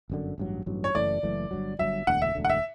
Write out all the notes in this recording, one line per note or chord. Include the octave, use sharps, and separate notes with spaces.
G1 F#2 D3
A1 G2 F#3
A1 G2 F#3
C#5
F#1 F#2 E3 A3 D5
F#1 F#2 E3 A3
G1 G2 F#3
G1 G2 F#3 E5
E1 D2 D3 F#5
E5
E1 D2 D3
F#5
E5